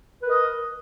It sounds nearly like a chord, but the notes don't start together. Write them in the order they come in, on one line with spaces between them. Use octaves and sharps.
B4 A#4 D#5